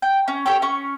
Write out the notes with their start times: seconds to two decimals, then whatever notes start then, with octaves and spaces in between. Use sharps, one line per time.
0.02 G5
0.28 C#4
0.46 G4 A4 C#5 G5
0.62 C#4 C#6